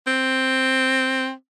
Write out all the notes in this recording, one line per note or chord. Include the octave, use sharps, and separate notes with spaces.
C4